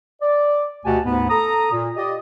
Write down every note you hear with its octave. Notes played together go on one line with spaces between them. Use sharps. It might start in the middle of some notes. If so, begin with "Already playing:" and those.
D5
D2 B2 F#4 G4 G#5 A5
D2 G#2 B3
A4 A#5 D#6
A#2
F4 G4 D5 D#5